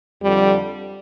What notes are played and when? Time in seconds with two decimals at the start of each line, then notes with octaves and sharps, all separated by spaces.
0.23 F2 D3 G3